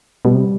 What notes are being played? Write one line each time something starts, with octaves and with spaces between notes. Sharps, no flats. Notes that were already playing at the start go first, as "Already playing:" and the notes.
B2 G3
C3